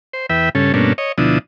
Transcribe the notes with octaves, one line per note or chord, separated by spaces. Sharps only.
C5
E2 B4 E5 G5
G2 C#3 C#4 A4
G2 B2 A3 A#3 C#4 D4
C#5 D#5
D2 B2 F3 D4 E4 D#6